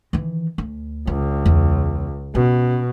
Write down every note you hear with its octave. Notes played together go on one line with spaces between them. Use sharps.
D#3 E3
D2
C#2 D4
E2
B2 C#4